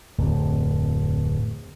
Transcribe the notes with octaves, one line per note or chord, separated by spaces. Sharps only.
D1 F2